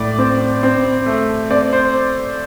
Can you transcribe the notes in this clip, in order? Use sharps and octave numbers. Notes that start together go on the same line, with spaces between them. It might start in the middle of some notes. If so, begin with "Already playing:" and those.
Already playing: A2 D5
C4
C4
A3
C4 D5
C5